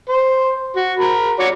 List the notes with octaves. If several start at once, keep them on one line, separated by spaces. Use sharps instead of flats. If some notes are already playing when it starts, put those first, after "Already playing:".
C5
F#4
A#4 B5
F#4 C#5 D5